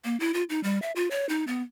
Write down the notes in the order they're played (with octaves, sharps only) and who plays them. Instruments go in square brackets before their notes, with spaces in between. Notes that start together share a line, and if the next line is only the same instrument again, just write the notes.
[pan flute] A#3
E4
F4
D#4
G3
E5
F4
C#5
D#4
B3